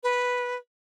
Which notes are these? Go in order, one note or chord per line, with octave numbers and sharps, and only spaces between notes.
B4